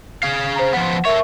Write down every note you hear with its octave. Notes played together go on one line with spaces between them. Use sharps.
G#4 F5
C5 A#5
F3 B3 F#5
A4 A#4 C#5 E5 C#6